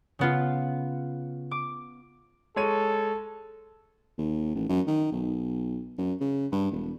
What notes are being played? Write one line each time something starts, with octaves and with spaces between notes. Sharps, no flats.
C#3 B3 F4
D6
G#3 A4 C#5 D#7
D#2
A1
F#2
D#3
B1
F#2
C#3
G2
E1